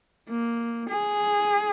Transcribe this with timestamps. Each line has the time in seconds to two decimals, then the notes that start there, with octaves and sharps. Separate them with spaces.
0.29 A#3
0.89 G#4